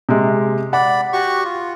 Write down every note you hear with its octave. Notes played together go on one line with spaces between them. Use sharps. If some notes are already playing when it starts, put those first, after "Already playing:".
C3 G#3
D5 F#5 B5
F#4 G4 C#6
F4